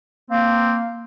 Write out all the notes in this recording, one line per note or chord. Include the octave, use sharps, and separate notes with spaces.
A#3 C4 F5